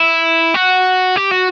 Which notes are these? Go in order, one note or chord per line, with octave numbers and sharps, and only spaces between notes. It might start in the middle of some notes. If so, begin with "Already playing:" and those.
Already playing: E4
F#4
G4
F#4